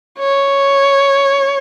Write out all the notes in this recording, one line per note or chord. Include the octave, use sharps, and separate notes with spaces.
C#5